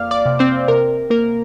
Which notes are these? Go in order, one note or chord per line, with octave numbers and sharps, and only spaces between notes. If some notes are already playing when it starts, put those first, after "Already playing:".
Already playing: F2 A#3 D5 F5 D6 F6
D5 D6
C3
C4 C5
C3 A#4
A#3 A#4